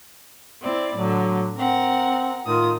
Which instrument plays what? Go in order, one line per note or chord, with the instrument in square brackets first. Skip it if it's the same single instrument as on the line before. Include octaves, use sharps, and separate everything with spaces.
[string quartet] C4 E4 D5
[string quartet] A2 D3 [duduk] F#3
[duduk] C4 [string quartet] A#4 F#5
[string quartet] A2 D#3 D#6 [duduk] F4